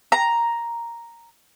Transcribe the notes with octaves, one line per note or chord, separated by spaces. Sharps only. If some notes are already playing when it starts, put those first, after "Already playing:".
A#5